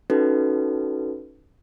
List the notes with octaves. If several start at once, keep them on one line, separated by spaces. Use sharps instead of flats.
C#4 D#4 F#4 A4 B4